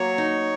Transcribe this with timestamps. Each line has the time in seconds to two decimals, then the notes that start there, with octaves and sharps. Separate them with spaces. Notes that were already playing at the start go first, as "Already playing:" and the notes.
Already playing: F#3 A#3 C#5
0.18 D#4